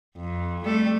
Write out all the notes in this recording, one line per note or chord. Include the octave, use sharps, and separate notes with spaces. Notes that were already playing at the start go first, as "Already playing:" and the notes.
F2
G3 A3 A4